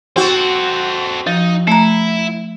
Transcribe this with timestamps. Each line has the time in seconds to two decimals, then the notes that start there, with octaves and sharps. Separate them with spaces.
0.16 C4 F#4 A4 C5
1.27 F3 D#4
1.67 A3 E4 A#5